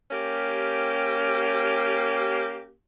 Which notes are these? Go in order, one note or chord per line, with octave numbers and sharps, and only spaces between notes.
A#3 C#4 G4